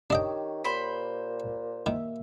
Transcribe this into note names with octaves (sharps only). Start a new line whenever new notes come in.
D#3 D4 G4 C#5 D#5 G5
A#2 C5 B5
D#3 A#3 E5